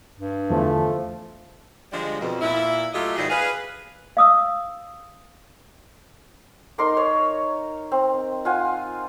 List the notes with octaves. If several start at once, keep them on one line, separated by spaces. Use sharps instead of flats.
G2
E2 D3 E3 F3 A3
D3 F3 G3 G#3
F2 B2
A#2 E4
F#3 A3 F4 G4 A4 D#5
G#2 D#3 G3 E4 F#4 G#4
G#4 B4 F5
F5 D#6 E6
D#4 A#4 C6 D6
C#5
C4
F4 F#5 G#5